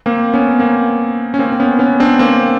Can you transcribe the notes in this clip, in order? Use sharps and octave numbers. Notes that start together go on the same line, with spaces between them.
A#3 C4
B3 C#4
A#3 C4
C#4
A#3 C4
C4
B3 C#4
B3 C#4
C4 D4
A#3 C4